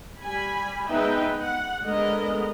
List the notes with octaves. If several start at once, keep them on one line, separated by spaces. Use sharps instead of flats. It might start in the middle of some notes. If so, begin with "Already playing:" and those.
G3 G#5 B5
G#3 B3 D#4 B4 E5 G5
F#5
D3 G#3 B3 A#4 D#5